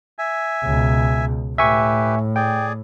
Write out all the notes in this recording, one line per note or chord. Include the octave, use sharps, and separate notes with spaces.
E5 G#5
C#2 B2
A2 G4 B4 E5 G#5 C#6
G#4 D5 G5